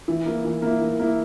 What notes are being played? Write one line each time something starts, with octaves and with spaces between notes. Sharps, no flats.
E3
A#3 E4
E3
A#3 E4
E3
A#3 E4